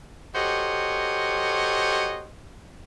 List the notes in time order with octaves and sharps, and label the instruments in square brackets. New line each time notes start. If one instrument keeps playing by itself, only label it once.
[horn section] F#4 G4 A4 C5 C#5 D#5